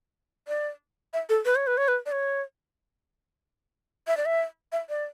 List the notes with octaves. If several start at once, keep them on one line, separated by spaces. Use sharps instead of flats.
D5
E5
A4
B4
C#5
B4
C#5
B4
D5
C#5
E5
D5
E5
E5
D5